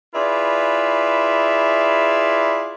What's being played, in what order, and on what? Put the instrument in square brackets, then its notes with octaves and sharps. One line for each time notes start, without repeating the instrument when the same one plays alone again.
[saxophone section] E4 F4 G#4 B4 D5 E5